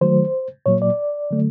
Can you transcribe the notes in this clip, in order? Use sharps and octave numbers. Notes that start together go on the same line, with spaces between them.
D#3 F#3 A3 C5
A#2 F#3 A#3 C#5
D5
D3 F#3 A3